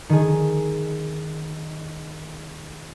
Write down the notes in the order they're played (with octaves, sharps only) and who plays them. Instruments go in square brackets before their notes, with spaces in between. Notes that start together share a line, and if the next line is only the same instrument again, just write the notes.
[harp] D#3 G#4